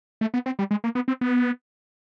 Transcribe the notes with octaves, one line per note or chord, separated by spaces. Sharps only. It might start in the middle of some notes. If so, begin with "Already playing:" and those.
A3
B3
C4
G3
G#3
A#3
B3
C4
B3